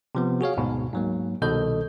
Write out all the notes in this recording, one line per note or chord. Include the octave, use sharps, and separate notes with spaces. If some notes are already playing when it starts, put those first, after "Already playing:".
C3 F3 B3
F#4 G#4 C#5 F5
D2 G#2 B2
G#2 F#3 A#3
C2 B2 D#3 A4 D#5 G6